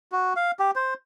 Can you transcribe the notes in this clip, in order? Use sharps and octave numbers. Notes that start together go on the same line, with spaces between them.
F#4
F5
G4
C5